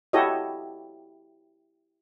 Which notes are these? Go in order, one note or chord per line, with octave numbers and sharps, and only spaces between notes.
E4 F#4 G4 A4 C#5 D#5